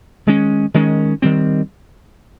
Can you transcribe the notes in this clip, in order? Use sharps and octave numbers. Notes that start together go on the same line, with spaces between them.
D#3 G#3 C#4
D#3 G#3 C#4
D#3 G3 C4